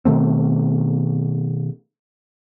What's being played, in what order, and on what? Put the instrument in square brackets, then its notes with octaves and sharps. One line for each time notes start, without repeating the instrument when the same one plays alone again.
[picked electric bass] B2 D#3 A3 C4